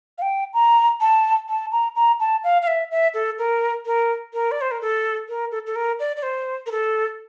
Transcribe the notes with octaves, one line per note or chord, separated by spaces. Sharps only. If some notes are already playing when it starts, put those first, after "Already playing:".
F5
G5
A#5
A5
A5
A#5
A#5
A5
F5
F5
E5
E5
A4
A#4
A#4
A#4
D5
C5
A#4
A4
A#4
A4
A4
A#4
D5
D5
C5
A#4
A4